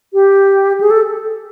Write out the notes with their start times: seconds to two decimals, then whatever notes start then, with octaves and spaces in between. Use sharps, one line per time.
0.14 G4
0.81 G#4
0.91 A4